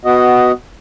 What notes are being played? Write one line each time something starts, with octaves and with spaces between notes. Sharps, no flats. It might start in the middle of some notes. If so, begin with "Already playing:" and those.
B3 F#4 D#5